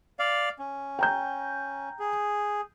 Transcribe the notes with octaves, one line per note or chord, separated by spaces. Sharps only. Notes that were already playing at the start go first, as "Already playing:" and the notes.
D5 F5
C#4
G5 A#5 G6
G#4